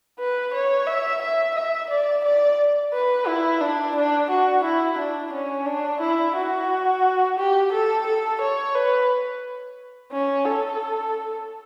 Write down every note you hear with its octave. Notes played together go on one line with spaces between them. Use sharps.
B4
C#5
E5
E5
E5
D5
D5
B4
E4
D4
D4
F#4
E4
D4
C#4
D4
E4
F#4
G4
A4
A4
C#5
B4
C#4
A4